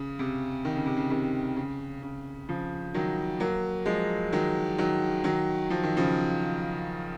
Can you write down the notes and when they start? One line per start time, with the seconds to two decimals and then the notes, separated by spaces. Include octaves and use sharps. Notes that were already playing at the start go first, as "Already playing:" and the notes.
Already playing: C#3
0.19 C3
0.65 D#3
0.76 C#3
0.86 C3
0.97 C#3
1.10 C3 D#3
1.57 C#3
2.02 C#3
2.48 C#3 F3
2.94 D#3 F#3
3.40 F#3 A#3
3.86 F3 G#3
4.32 D#3 F#3
4.78 D#3 F#3
5.24 D#3 F#3
5.70 F3
5.83 D#3
5.97 C#3 F3